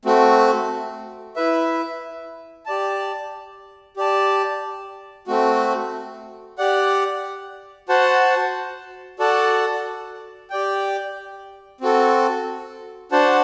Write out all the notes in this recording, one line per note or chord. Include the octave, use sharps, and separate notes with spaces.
A3 C4 F#4
E4 B4 E5
G4 D5 A5
G4 D5 A5
A3 C4 F#4
G4 D5 F#5
F#4 C5 F#5 A5
F#4 A4 D5 F#5 A5
G4 D5 G5
C4 F#4 A4
D4 F#4 C5 F#5 A5